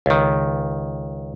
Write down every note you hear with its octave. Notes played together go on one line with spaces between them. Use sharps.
C#2 D#3